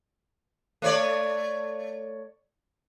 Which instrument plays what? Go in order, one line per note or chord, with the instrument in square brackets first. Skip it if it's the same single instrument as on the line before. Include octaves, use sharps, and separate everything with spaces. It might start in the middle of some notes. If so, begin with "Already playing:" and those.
[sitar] A3 C#5 D5